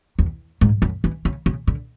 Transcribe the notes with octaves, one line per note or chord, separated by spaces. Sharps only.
E2
G#2
F#2
E3
C#3
C#3
D3